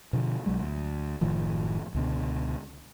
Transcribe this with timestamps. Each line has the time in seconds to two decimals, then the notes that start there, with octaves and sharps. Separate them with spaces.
0.13 B2 D3 F3
0.46 B1 F#3 G#3
0.60 D2
1.21 F#1 A2 D#3 F3
1.95 C#2 B2 D3